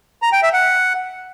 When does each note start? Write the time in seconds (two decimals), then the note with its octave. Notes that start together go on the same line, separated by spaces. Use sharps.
0.22 A#5
0.32 G5
0.43 E5
0.53 F#5